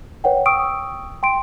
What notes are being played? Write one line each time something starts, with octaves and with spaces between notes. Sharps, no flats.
B4 C#5 F#5 G5
G5 C#6 D#6 E6 D7
G5 C6 D7